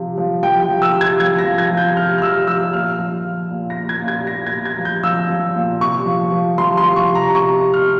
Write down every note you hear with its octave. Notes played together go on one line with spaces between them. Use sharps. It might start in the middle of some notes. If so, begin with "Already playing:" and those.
Already playing: C3 F3
F3
F3 G5
G5
F3
E6
C3
G#6
F3 G#6
A#6
F3
G#6
F3
G6
C3 F6
F6
F3 E6
F3 E6
A#2 F6
F3
F3
A#2
A#6
A#2
G#6
A#2
G#6
A#2 A#6
G#6
A#2
G#6
F3
G6
F3 E6
F3
A#2
C3 C#6
F3
F3
F3 C6
C6
F3
C#6
C3
A#5
C3 C#6
C3
F6